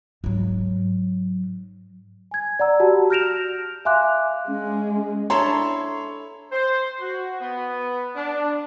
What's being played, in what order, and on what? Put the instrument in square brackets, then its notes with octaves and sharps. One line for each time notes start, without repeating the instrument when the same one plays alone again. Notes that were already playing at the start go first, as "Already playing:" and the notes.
[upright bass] G#2 F#3
[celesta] G#5 G#6
D5 F#5 A#5 E6
F#4 G4 A5
F6 G6 A#6 D7 E7 F7
E5 F5 G#5 C6 D6 F#6
[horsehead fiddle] G#3 [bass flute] C#4
[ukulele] D4 A#5 [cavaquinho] E4 A4 C6 [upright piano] C#5
[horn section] C5
F#4
B3
D4